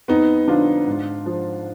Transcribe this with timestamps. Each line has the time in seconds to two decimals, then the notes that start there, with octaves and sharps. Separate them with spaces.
0.08 F2 B3 D#4
0.48 D3 F3 D4 F4
0.86 G#2
1.26 F3